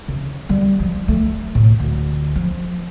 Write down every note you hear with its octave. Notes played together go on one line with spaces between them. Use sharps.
C#3
G3
F3
A3
A2
D2
F3